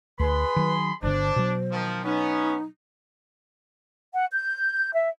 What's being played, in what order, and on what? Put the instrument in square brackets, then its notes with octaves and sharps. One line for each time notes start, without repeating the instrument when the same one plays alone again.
[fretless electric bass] D2 [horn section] G#4 B5 C6 [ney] B4
[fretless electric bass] D#3 F#3
[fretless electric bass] G1 D3 [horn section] D4 [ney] C5
[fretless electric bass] B2 F#3
[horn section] D#3 F3
[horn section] B3 C#4 [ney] D#4
[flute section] F#5
G6
E5